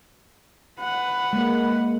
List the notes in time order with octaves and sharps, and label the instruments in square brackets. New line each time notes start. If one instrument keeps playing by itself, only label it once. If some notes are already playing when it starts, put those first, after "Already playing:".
[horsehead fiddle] B4 F#5
[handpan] G#3 A#3